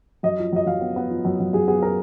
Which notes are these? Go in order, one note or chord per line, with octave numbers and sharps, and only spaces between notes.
F#2 D#5
F3
F#2 D#5
F#2 F5
B3
B3
F3
F#2
F#2
F#2 G#4
B3 G#4
A#4